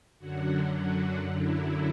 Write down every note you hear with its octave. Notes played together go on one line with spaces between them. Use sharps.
F#2 D3 F#3 F#4
F#4
E4